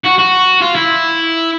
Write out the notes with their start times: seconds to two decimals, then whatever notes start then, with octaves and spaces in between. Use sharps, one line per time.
0.04 F#4
0.18 F#4
0.61 F4
0.75 E4